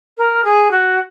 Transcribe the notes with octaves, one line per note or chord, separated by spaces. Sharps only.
A#4
G#4
F#4